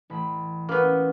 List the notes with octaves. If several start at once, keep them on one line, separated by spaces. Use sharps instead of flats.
A1 B5
A#3 B3 C#4